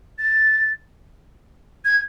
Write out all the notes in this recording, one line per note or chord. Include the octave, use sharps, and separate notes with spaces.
A6
G#6